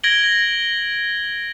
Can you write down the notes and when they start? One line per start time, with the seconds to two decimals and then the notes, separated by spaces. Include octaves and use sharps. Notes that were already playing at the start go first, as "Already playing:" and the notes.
0.04 G#6 A#6 D7 F#7 G7